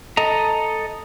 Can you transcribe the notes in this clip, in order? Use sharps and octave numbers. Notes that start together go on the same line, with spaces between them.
A4 D#5 A#5